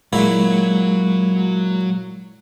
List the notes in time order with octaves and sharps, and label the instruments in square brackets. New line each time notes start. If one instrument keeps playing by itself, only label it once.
[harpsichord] A#2 E4 [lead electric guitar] F#3 F#4 [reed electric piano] G#3